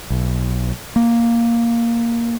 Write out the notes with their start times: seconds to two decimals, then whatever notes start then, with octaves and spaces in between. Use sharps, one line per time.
0.10 B1
0.96 A#3